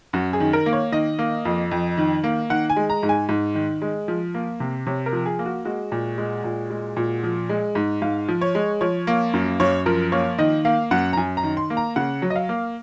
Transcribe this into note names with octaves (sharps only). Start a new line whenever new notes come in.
F#2 F#4
G#4
D#3
A#4
A#3
C#5
D#3 D#5
A#3
F2
F2
D#3
A#3
D#3 F#5
G#5
G#3
A#5
G#2
G#5
G#2
D#3
G#3
F3
A#3
C3
C3 C#5
A#4
F3
G#4
A#3
F#4
G#3 F#4
A#2
G#3
A#2
G#3
A#2
F3
G#3
G#2
G#2 F5
F3
C#5
G#3
F3 C#5
A#3
F#2
F#2 C#5
F3 A#4
A#3 C#5
D#3 D#5
A#3 F5
F#2 F#5
A#5
F#2 G#5
A#5
D#3
C6
A#3
A#5
C#3 F#5
F#3
D#5
F5
A#3